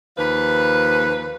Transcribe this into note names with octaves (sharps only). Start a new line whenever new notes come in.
D#2 F3 B4